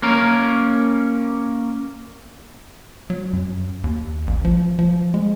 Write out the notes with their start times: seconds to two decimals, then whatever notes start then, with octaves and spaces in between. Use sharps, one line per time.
0.02 A#3 C#4 A#4
3.10 F#3
3.33 F#2
3.84 D#2
4.27 A1
4.45 F3
4.79 F3
5.14 G#3